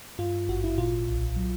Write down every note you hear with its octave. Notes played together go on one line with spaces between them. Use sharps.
G2 F4
G#1 F#4
E4
A#2 F4
B1
F#3